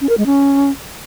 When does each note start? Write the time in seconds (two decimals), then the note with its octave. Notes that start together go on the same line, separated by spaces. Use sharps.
0.01 C#4
0.09 A#4
0.18 G#3
0.26 C#4